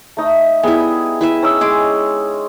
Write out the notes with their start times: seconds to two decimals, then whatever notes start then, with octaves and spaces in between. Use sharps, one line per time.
0.17 A3 D#4
0.63 G3 B3 E4 G#4
1.21 E4 B4 E5
1.42 C#4 D#4 E6
1.61 G#3 G#4 D6